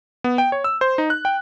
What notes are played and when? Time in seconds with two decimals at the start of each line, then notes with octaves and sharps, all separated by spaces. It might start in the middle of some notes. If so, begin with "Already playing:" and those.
0.24 B3
0.38 G5
0.52 C#5
0.64 E6
0.81 C5
0.98 D#4
1.10 F#6
1.25 G5